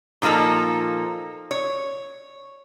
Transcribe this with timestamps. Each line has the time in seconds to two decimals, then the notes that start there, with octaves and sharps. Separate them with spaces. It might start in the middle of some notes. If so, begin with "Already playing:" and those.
0.22 A#2 F3 A#3 D#4 A4
1.51 C#5